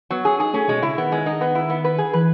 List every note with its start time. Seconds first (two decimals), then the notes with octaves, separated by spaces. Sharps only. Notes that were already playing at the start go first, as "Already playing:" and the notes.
0.10 F#3 B3
0.25 C#4 G#4
0.39 D#4 G#4
0.53 A3 C#4
0.68 B2 G#3
0.83 C#3 E4
0.97 D#3 B3
1.12 G#3
1.26 D#4
1.41 B3
1.55 E4
1.70 B3
1.84 B4
1.98 G#4
2.13 E3 B4